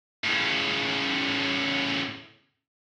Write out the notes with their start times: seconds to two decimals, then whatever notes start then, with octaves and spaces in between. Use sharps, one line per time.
0.24 A2 C#3